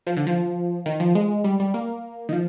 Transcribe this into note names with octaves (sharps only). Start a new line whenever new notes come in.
F3
D3
F3
D#3
F3
G#3
G3
G3
A#3
D#3
F3